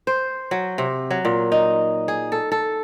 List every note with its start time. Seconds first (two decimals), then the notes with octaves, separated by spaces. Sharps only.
0.07 C5
0.51 F#3
0.78 C3
1.11 F#3
1.25 A#2
1.52 D#4
2.08 G#4
2.32 A4
2.52 A4